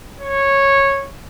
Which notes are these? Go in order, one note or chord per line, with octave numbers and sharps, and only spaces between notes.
C#5